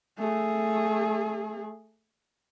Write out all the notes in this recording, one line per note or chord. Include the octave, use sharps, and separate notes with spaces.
A3 G#4